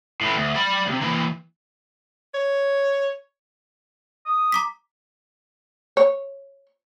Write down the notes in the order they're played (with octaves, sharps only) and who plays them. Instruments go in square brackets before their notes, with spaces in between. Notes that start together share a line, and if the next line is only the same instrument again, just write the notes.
[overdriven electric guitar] A2 E3
D2
D5 B5
D2 C3
E3 A#3
[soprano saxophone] C#5
[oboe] D#6
[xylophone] A#5 D6 B6
[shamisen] C#5